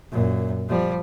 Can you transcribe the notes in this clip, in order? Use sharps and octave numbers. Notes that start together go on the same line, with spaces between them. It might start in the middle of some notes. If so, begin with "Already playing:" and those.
F#2 A#2
F3 G3